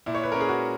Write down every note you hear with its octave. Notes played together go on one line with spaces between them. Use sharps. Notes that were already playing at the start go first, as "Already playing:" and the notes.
A#2 E4
C#5
B4
C#4 A#4
G#4
F#4